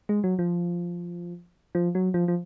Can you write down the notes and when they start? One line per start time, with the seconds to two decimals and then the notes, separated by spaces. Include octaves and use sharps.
0.09 G#3
0.24 F#3
0.39 F3
1.75 F3
1.95 F#3
2.14 F3
2.28 F3